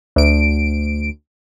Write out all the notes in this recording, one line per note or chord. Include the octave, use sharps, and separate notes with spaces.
D2 D7